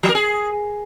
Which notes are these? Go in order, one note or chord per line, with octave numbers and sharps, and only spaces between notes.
F3
A#4
G#4